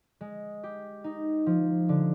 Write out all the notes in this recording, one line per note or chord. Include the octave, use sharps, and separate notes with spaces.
G#3
G4
D#4
F3
D3